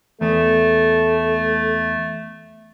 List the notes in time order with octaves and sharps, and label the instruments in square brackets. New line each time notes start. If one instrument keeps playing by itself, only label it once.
[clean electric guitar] E2 [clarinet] A3 [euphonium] A4